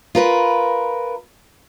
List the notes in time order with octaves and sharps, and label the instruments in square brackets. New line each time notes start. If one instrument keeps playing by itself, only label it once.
[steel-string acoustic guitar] F4 A#4 B4